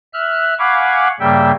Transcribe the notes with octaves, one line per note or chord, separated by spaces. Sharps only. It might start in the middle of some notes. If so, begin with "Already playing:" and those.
E5 F6 F#6
F5 F#5 G#5 B5 C#6 D6
G2 C#3 G3 A#3 E5 G5